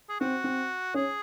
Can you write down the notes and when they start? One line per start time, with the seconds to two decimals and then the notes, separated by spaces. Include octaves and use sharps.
0.09 G#4
0.21 C4 F#4
0.44 C4
0.94 C#4 G#4